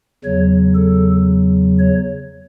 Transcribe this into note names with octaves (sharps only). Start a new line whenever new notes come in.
E2 C#3 F#3 C#5
A4
C#5